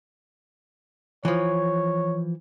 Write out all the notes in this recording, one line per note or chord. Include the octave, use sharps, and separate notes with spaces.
E3 F3 C#5